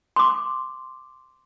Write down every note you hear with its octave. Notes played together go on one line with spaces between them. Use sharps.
C6 D6